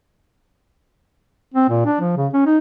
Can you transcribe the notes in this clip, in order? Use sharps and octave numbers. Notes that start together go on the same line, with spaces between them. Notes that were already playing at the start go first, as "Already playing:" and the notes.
C4
A#2
D4
F3
C#3
C#4
D#4